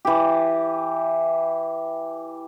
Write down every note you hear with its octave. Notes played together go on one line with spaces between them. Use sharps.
E3 G4